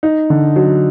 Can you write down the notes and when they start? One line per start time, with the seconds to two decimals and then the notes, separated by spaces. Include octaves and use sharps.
0.03 D#4
0.30 D3
0.56 F#3